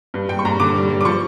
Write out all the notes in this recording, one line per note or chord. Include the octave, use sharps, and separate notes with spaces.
G2
G2 G5
C#6
G2 A#5
D3 D6
G3
G3
D6
F3 C#6